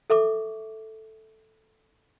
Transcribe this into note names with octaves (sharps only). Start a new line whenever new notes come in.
A4 E5 C#6 D6